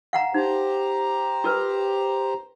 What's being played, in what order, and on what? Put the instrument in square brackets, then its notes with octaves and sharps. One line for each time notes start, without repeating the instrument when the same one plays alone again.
[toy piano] F5 F#5 A#5
[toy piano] D#4 [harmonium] G4 C5 A#5
[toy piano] F4 A#4 B4